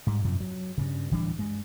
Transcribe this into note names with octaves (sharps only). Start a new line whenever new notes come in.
G#2 G3
F#2 C3 F3
F#3
G2 C#3
D1 E3 G3 D4
G2 G#3